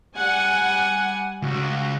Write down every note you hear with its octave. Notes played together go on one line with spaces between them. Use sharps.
G3 F#5 G#5
C#2 F#4